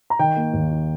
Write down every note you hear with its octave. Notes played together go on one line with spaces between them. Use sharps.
A#5
D#3 G5
A#3
D#2
D#4